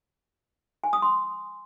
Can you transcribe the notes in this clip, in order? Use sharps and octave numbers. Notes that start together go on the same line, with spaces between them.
G#5
D#6
C6